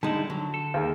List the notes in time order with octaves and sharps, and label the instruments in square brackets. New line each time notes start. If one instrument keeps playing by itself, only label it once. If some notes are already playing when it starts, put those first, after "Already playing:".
[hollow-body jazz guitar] D3 G#3 D#4 [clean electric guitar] G3 E4 [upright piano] A5
[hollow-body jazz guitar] D3 [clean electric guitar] F#3
[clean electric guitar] A4
[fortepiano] D#2 [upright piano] G#4 A#4